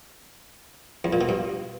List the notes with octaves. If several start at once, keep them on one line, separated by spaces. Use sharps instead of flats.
E2
A#2
B2
G2